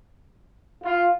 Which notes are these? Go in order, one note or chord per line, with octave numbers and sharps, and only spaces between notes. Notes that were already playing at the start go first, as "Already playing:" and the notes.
F4